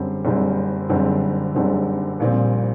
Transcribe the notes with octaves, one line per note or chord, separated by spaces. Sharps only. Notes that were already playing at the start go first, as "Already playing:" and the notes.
Already playing: F#1 F#2 D3 G3 C4
F#1 F#2 D3 G3 C4
F#1 F#2 D3 G3 C4
F#1 F#2 D3 G3 C4
A#1 A#2 G3 C4